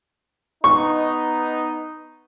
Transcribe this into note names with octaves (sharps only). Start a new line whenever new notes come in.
B3 D#4 C#6